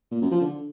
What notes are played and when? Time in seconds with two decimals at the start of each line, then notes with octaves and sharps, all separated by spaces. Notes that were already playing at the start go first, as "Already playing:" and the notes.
0.11 A#2
0.21 F#2
0.31 F3
0.41 D3